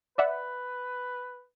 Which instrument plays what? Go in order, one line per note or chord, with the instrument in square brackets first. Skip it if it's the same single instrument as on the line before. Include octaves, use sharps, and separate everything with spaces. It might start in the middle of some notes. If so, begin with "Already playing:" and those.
[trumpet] B4 [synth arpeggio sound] D5 E5 F#5